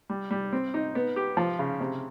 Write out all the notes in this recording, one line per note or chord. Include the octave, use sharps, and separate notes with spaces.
G3
G3
C4
D#4
B3
G4
F3
C#3
C3